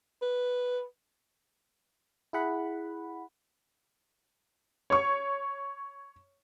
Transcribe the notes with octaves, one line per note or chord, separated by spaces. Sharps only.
B4
E4 G#4 F#5 B5
C#5 C#6